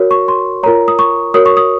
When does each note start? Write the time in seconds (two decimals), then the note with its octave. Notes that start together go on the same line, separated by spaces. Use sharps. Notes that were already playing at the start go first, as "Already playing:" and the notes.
Already playing: F#4 A#4 C#5
0.11 C#6
0.28 C6
0.63 F4 A#4 C#5 A#5
0.88 D#6
0.99 C#6
1.34 F#4 A#4 C#5 D#6
1.46 C#6
1.57 D#6